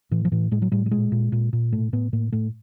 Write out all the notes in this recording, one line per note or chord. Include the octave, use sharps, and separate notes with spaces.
A2 E3
F3
A2 E3
A2 G#3
F#3
A2 G3
G3
A#2 G#3
A#2
A#2
A#2
A2 A3
A2 B3
A2 A#3
A2 A3